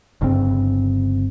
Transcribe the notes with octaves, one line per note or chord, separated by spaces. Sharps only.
G1 G2 C#3 C4